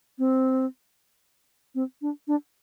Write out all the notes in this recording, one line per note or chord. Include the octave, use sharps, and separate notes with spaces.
C4
C4
D4
D4